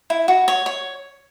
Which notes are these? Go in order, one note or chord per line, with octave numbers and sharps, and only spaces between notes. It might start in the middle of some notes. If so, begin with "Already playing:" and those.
E4
F#4
C#5
C#5